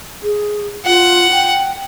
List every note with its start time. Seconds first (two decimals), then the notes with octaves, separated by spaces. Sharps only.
0.23 G#4
0.86 F4 F#5
1.32 G5